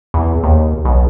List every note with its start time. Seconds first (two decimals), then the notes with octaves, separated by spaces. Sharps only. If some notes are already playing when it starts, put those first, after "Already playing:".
0.14 E2
0.43 D#2
0.85 B1